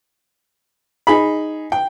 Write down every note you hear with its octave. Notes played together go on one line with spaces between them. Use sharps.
D#4 G#4 B5
G5